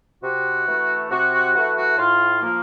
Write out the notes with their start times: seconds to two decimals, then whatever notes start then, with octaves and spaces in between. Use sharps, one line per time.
0.23 C3 F#4
0.68 E3 A3
1.11 C3 F#4
1.33 F#4
1.55 E3 A3 F#4
1.76 F#4
1.98 A2 F4
2.42 F3 A#3